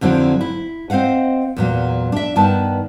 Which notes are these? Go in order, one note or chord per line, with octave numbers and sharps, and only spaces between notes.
F2 D3 F#3 C4 E4
E4
C4 C5 D#5 F5 F#5
E2 A#2 F#3
D4 E5
G2 D#3 B3 A5